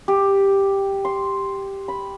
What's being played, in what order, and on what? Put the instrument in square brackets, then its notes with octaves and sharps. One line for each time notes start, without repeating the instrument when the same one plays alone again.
[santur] G4
C6
B5